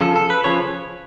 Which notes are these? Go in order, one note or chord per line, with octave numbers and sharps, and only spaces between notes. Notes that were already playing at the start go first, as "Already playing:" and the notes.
C#3 F3 A4
A4
B4
C#3 F3 C#5